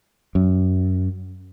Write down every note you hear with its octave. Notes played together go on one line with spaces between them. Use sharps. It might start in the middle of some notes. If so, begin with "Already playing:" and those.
F#2